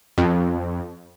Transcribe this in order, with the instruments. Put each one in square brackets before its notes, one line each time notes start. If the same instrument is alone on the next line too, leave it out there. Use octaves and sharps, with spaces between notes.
[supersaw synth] F2